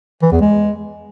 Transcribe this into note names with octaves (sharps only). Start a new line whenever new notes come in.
E3
E2
G#3